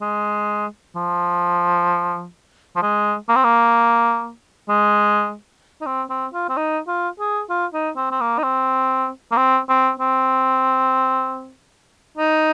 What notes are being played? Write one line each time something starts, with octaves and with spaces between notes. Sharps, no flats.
G#3
F3
F3
G#3
A#3
C4
A#3
G#3
D#4
C4
C4
F4
C4
D#4
F4
G#4
F4
D#4
C4
C4
A#3
D#4
C4
A#3
C4
C4
C4
D#4